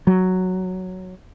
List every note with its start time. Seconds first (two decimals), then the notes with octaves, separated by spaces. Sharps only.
0.07 F#3